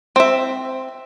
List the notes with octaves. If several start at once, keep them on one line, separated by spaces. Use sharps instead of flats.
C4 E5